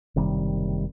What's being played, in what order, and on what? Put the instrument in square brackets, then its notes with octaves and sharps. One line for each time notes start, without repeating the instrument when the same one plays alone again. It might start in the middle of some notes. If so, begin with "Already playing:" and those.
[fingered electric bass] F#1 C3 D#3 G3